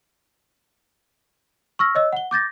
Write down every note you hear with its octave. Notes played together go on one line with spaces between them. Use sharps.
C#6 E6 F6 A#6
C#5 D#5 E6
F#5 G7
D6 G6 A6 A#6